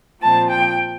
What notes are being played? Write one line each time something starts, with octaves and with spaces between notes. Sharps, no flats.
A#2 F3 C4 A5
G5